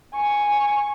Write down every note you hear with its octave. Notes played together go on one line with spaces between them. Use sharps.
G#5 C#6